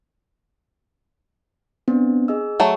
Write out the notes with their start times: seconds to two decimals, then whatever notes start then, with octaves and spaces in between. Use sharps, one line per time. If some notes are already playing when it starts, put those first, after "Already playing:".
1.88 B3 C4 D4
2.28 G#4 D#5 E6
2.60 F#3 A3